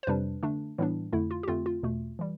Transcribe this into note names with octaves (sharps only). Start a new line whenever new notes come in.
C5
F2 C3 G3 D4 B4
D3 A3 D4
A2 E3 G3 B3 D4
F2 D3 A3 E4
F4
G4
F2 D3 A3 C4 F4
F4
E2 B2 A3
E3 G3